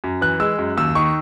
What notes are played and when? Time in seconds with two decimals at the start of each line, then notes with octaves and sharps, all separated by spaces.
0.04 F#2
0.21 E3 F#6
0.40 G#3 E6
0.58 F#2
0.77 D#2 E6
0.95 D#3 C#6